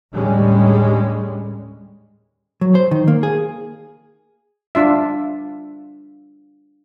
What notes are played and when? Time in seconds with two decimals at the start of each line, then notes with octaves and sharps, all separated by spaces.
0.13 D#2 A2 D3 G3 G#3 C#4
2.61 F#3
2.75 C5
2.91 D#3
3.08 A#3
3.23 G#4
4.75 D4 F4 E5